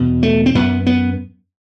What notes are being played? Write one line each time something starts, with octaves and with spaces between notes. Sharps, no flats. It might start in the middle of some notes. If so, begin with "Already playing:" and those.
Already playing: E2 B2
A3
C4
F#2 B3
B3